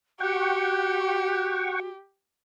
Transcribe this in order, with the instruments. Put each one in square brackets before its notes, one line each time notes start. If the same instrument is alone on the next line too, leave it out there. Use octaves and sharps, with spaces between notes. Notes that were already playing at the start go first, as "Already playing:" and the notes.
[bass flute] F#4 [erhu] G4 [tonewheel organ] F#5 G5 C#6